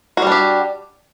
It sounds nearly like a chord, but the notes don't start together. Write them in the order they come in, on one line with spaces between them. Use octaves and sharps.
F#4 G3 D4 G4